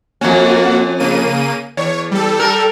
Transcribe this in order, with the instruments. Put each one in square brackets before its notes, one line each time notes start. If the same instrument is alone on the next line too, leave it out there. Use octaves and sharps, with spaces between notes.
[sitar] F2 C#4 [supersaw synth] A#3 F#4
[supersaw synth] C#3 A#3 D#7
[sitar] E2 [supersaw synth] C#5
[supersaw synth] G3 A4
[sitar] A#4